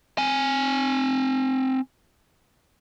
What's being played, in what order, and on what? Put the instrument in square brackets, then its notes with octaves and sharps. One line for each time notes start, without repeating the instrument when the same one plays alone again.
[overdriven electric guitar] C4 G#5